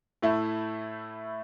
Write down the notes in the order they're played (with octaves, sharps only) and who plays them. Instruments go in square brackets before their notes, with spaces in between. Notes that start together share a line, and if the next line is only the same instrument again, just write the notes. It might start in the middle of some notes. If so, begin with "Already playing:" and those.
[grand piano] A2 A3 E4